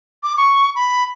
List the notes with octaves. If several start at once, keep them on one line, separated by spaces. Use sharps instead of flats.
D6
C#6
B5